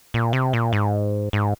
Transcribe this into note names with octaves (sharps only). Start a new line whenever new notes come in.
A#2
C3
A#2
G#2
G#2